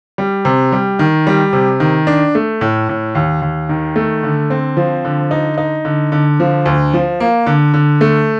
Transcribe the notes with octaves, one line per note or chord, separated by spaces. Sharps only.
G3
C3
G3
D#3
G3
C3
D#3
D4
A3
A2
A2
D#2
D#2
D#3
A3
D3
C4
F3
D3
D#4
D#4
D3
D3
F3
D2
F3
A#3
D3
D3
A3